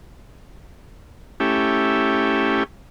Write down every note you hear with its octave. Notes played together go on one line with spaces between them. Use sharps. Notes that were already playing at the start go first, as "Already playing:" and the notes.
A3 C#4 E4 G4